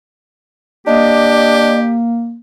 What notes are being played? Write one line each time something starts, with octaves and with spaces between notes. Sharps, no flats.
A#3 D4 G4 D#5